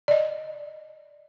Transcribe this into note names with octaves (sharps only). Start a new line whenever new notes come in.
D5 D#5